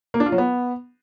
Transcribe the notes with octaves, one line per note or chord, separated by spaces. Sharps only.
A#3
D4
F4
F#3
B3